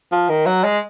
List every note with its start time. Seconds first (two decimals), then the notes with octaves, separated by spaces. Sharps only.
0.12 F3
0.29 D#3
0.46 F#3
0.64 G#3